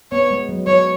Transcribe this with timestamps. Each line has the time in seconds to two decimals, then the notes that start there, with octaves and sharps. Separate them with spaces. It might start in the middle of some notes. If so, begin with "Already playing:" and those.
0.12 B3 C#5
0.31 G#3
0.49 F#3
0.67 F#3 C#5